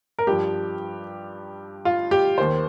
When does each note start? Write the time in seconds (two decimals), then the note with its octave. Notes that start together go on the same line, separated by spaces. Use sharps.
0.19 A#4
0.27 G2 F3 G4
1.85 F4
2.11 G4
2.38 D#2 D#3 C5